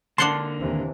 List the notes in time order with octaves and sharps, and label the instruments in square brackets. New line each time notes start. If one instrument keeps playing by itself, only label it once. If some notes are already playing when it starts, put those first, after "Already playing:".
[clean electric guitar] D3 A#3 [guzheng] D4 F#5 A5 [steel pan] C6
[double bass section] D#2 C3 E3